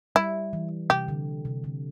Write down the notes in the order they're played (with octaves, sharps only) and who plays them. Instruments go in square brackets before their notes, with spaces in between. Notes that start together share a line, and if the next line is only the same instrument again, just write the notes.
[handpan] G3 [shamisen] E4
[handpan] E3
[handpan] C3 [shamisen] G4
[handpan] D3
C3
D3